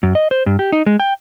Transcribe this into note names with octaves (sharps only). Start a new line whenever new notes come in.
F#2
D#5
C5
G2
G4
D#4
G#3
G5